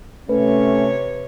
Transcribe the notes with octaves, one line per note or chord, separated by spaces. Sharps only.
C3 A3 C#4 B4 C#5